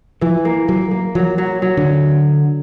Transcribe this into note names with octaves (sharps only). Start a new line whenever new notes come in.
E3 F3
A#3
F#3 A#3
A#3
F3 F#3
F#3
F#3
D3